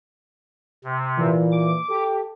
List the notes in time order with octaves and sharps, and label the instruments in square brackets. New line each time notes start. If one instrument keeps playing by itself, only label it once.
[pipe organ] C3
[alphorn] A#2 [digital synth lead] E3
[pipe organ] D6
[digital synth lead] G4 [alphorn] A4